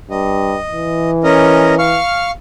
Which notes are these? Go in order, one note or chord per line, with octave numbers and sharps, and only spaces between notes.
G2 D#5
E3
C#4 A#4 D#5
F5 C#6 F6